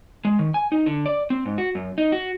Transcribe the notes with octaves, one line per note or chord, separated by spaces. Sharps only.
G#3
D#3
G#5
D#4
D3
D5
C4
G#2
F#4
F#2
D#4
F#4